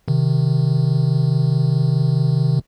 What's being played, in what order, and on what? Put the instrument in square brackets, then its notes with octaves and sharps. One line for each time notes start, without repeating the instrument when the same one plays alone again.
[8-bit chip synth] C3 D#3